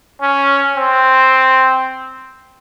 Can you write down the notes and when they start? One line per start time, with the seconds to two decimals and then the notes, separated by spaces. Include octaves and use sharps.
0.22 C#4
0.77 C4